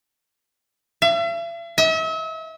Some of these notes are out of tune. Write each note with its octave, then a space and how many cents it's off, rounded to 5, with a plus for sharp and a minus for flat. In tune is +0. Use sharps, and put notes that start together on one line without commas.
E5 +45
E5 -40